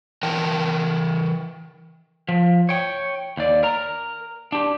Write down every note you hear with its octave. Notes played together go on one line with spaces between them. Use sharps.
E3 A#4 G5 A5
F3
C#5 G5
D#2 D5
A#4 A#5
D4 G4